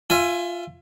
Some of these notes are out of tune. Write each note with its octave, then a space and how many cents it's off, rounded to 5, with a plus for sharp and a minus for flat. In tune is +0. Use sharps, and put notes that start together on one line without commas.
F4 +0 E5 +25 G#5 +0